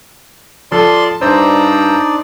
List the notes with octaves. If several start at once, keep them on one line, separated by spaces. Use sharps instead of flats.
F3 A4 D5 A5 C6
G2 D4 D#4 C5 D5 A#5 E6